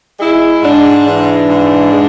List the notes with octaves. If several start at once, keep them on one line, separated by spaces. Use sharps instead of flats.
G#3 E4
G#2 D4
E3 D4
G#2
G#3